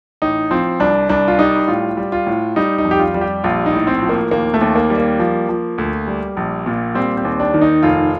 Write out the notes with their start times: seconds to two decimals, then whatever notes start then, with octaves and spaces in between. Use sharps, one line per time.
0.22 A1 D#4
0.51 F3 C4
0.80 C2 D4
1.09 C2 D4
1.28 F4
1.38 G3 D#4
1.68 A2 F4
1.97 G3
2.12 F4
2.26 A2
2.56 G3 D#4
2.78 D#4
2.85 F2
2.91 G4
2.99 F4
3.14 G3
3.21 G4
3.44 A#1 F4
3.66 D#4
3.73 A2
3.87 C4
4.02 F3
4.09 A#3
4.31 D#2 A#3
4.54 A3
4.61 D#2
4.76 A#3
4.90 G3
4.98 A#3
5.20 F3
5.49 F3
5.78 D2
6.07 G3
6.37 A#1
6.66 A#2
6.95 G3 C4
7.17 C4
7.25 D#2
7.40 D4
7.54 D#3
7.61 D#4
7.83 F1 F4